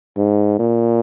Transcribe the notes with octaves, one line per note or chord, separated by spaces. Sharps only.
G#2
A#2